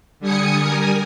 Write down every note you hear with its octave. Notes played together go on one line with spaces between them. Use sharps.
D3 G3 G#5 D#6 C#7
G3 A#4 G#5 D#6